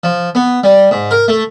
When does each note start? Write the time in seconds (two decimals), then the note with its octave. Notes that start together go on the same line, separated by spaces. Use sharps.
0.04 F3
0.35 B3
0.64 G3
0.91 G#2
1.11 A#4
1.28 A3